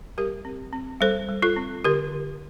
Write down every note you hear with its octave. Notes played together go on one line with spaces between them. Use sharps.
G3 G4 A#4
C4
C4
G3 A4 C5
G3
F4 A4
C4
D3 G4 A#4
D3